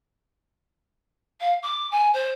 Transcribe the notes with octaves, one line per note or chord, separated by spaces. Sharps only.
F5
D6
G#5
C5